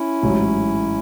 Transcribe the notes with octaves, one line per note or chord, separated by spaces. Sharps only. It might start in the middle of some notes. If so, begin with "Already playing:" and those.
Already playing: C#4 E4
A1 G#2 F#3